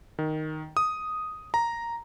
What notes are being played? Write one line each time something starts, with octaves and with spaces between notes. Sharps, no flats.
D#3
D#6
A#5